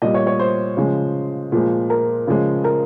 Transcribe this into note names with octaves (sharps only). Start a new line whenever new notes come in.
A#2 G3 D#5
C#5
C#5
C5
C#3 F3 G#3
A#2 F3 G#3
A#4
C#3 F3 G#3
A#4